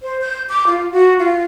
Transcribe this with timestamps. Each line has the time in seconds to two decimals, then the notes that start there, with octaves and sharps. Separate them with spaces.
0.02 C5
0.21 G6
0.49 D6
0.67 F4
0.92 F#4
1.19 F4